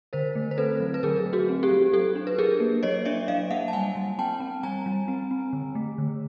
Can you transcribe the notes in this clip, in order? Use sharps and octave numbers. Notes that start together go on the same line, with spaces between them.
D3 A#4 C5
A3
C5
C4 A4 B4
F#3
B4
D3 G#4 A#4
A3
F#4 G#4
C4
G4 A4
F#3
F#3 G4 A4
D4
B4
F#3 G#4 A#4
A#3
F#3 C#5 D#5
D4 D5 E5
F#3 D#5 F5
A#3 E5 F#5
A5
G3 F#5 G#5
G3
C4 G5 A5
C4
G3 G#5 A#5
G3
C4
C4
D3
A3
D3